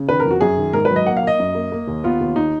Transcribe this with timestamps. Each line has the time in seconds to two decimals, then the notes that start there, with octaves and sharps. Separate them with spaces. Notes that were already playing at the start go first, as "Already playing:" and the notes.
Already playing: C#3
0.09 D#3 B4
0.20 A#4
0.25 F2
0.31 F#4
0.41 F#2 G#4
0.57 D#3
0.73 G#2 A#4
0.85 F#3 B4
0.96 D#5
1.06 A#3 F#5
1.17 F5
1.23 A#3 D#5
1.39 F#2
1.55 A#3
1.72 A#3
1.87 D#2
2.04 B3 F4
2.21 D#2
2.36 D#4